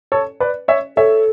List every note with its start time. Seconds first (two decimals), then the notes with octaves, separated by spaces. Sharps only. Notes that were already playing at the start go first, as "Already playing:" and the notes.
0.12 A4 C#5
0.40 B4 D5
0.68 C#5 E5
0.97 A4 C#5 E5